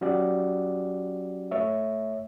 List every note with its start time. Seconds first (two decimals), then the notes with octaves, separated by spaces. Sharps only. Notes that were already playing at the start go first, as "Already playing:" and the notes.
0.01 F#3 C#4 F#4 G4 D5
1.51 A3 C#5 E5